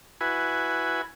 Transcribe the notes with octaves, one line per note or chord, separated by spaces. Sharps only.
E4 F#4 B4 G#5